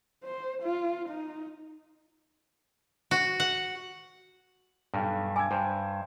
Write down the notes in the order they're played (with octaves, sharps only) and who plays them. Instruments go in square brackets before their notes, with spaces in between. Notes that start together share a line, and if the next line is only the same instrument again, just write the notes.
[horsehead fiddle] C5
F4
D#4
[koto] F#4
F#5
[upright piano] B1 [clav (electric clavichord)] G2
[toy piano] G#5 [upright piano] D6 E6 G#6
[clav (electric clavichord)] G2 [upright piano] C5